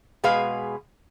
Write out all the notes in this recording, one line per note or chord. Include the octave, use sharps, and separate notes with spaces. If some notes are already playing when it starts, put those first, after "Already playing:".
B2 G#3 G#4 B4 F5